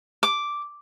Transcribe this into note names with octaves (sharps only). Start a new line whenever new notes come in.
D6